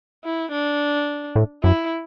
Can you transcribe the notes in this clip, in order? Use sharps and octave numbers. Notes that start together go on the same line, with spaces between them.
E4
D4
A2
F#2 E4